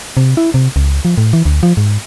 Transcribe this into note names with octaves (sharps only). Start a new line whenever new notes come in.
C3
E4
C3
C#2
F3
A2
E3
D2
F3
G#2